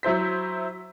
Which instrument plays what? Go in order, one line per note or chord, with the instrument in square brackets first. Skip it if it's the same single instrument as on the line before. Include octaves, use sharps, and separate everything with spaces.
[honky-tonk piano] F#3 E4 C5 B6